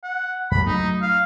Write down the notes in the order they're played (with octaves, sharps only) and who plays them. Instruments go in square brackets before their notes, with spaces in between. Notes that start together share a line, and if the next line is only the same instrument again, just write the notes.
[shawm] F#5
[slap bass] F2 G3 [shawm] B5
[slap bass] F#3 A3 [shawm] D#4
[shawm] F5